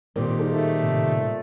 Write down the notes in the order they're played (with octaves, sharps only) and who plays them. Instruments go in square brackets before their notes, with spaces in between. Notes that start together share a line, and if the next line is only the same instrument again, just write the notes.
[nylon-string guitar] A#2 C4 [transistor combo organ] D#3 G3
[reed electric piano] D#4 G#4 A4
[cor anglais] A3
[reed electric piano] A2 C3